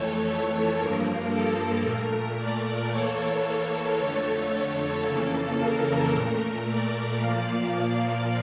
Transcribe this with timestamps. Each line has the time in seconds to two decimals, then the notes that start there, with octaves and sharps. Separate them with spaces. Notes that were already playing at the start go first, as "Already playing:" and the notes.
Already playing: F2 E3 A3 A4 C#5
0.75 G2 F3 A#3 A#4
1.29 A4
1.82 A#2 A3 A#4
2.36 A#4 D5
2.90 E2 E3 A#3 A4 C#5
3.98 F2 D3 A3
4.52 A4
5.05 F2 C#3 E3 A#3
5.59 A#4
6.12 A#2 A3
6.65 A#4 D5
7.19 A#2 F3 A#3 D5 F5